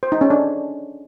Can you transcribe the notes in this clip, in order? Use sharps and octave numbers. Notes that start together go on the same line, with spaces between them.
C5
D#4
C#4
D4